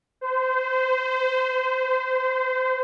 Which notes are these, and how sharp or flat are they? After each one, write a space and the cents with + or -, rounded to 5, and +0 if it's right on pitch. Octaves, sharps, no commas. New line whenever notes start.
C5 -25